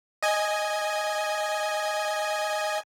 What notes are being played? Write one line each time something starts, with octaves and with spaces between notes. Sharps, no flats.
D#5 G#5